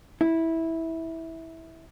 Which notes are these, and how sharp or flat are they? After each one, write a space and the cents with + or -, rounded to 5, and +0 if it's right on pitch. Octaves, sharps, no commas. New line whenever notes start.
E4 -15